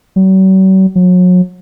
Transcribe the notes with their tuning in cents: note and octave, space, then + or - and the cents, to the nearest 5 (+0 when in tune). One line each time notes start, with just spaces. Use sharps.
F#3 +45
F#3 -35